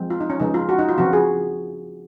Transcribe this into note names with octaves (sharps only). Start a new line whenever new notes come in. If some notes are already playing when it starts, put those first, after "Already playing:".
Already playing: F3 G#3 C4
F4
D#4
C#4
C#3 F3 G#3 D#4
F4
F#4
D#4
F4
C#3 F3 C4 F#4
G#4